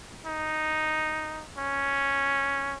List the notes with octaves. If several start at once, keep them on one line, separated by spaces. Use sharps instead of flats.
D#4
C#4